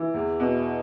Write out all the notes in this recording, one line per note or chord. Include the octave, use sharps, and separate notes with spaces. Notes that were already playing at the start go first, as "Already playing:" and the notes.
Already playing: E3
E2
B2